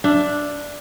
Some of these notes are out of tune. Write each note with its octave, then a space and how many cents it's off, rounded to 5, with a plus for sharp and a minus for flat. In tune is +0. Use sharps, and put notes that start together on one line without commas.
D4 +0 E5 +30